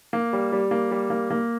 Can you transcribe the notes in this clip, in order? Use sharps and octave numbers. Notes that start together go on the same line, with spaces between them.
A#3
G3
G3
A#3
G3
A#3
A#3